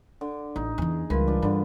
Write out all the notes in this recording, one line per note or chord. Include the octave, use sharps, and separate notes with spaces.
D3
A1 D#4
E2 E3 G#4
C#2 E3 G3 F4 A#4 B4
D4 F4
G2 D3 D4 B5